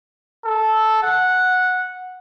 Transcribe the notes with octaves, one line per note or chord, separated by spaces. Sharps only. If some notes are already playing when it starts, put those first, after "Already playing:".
A4
F#5